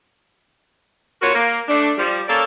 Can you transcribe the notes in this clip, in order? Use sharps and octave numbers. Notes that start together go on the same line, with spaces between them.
B3 F4 F#4 A#4 C#5
A#3
A3 D4
F3 G3
A#3 C#4 A4 D5 F5